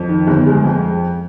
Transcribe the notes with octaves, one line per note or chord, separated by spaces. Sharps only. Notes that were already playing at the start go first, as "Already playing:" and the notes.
Already playing: F2
D#3
G1
G#3
F2